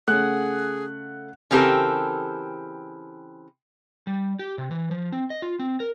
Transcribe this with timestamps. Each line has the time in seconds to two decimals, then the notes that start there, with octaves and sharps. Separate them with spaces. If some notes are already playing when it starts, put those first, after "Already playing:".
0.08 C#3 A3 G#4 F#5
1.51 C#3 E3 C4 G4 A4 A#4
4.07 G3
4.39 G4
4.58 C3
4.71 E3
4.91 F3
5.12 C4
5.30 D#5
5.42 F4
5.59 C4
5.80 A#4